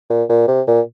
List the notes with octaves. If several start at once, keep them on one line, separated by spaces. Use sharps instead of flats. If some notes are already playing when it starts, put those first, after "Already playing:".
A#2
A#2
C3
A#2